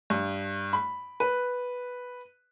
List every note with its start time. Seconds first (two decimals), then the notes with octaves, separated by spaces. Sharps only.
0.10 G2
0.73 B5
1.20 B4